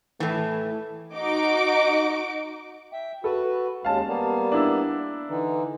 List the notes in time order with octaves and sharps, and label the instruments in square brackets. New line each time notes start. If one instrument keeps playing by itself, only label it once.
[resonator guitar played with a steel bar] A2 E3 [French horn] A3
[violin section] D#4 F#4 D6 D7
[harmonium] E5 G5
[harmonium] F#4 B4 [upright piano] A4
[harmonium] D#2 G#3 C#4 [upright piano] F5 A5
[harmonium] G3 A#3 B3
[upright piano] D4 E4 E6
[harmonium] D3 E3 D#4